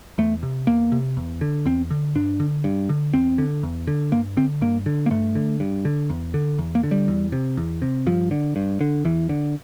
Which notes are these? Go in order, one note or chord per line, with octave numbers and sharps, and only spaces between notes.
E2 A3
C3
E2 A#3
C3
E2
D3
E2 C4
D3
G2 D4
D3
G2
D3
E2 C4
D3
E2
D3
G2 A#3
D3 C4
G2 A#3
D3
A#3
G2 A3
D3
G2
D3
E2
D3
E2
A#3
D3
G3
E2
C3
E2
C3
G2 F3
D3
G2
D3
E2 E3
D3